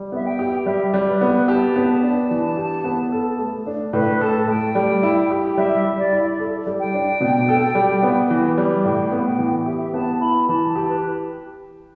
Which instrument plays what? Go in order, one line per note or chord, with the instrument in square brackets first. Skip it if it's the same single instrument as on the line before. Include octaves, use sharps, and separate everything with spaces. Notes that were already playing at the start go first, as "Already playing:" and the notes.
Already playing: [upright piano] G3
[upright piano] B3 [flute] E5
[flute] G5
[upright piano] G4
[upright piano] G3 [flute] E5
[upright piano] G3
[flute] B4
[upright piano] B3
[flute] B4
[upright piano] G4 [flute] A5
[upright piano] B3
[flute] A5
[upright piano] D4
E3
G4
B3
A4
A3
D4
[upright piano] A2 [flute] B4
[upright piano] A4 [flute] A5
[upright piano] A3 [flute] G5
[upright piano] G3
E4
G4
[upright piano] G3 [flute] E5
[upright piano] G3
[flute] D5
[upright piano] E4
A4
G3
[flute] G5
[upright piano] D4
B2
A4
G3
B3
E3
G3
[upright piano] A2 [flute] G5
[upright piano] B3
[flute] G5
[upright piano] E3
[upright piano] G4 [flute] E5
[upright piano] B3 [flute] A5
[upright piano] E4 [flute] B5
[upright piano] E3 [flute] A5
[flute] A5
[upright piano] G4
[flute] B4